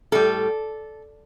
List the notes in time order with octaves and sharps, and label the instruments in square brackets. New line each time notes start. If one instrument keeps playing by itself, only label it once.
[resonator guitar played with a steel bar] A2 G3 A4